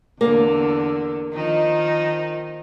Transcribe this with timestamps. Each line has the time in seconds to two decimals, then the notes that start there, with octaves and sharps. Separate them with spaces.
0.21 E2 D3 A#3
1.33 D#3 F3 D#4